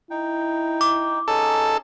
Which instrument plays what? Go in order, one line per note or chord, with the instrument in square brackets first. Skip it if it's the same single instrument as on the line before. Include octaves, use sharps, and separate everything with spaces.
[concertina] D#4 G5 [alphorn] E4
[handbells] D6
[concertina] C#4 D#4 G#4 [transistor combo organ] A4